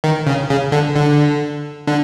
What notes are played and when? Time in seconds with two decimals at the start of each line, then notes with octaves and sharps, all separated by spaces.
0.04 D#3
0.27 C#3
0.49 C#3
0.72 D3
0.96 D3
1.87 D3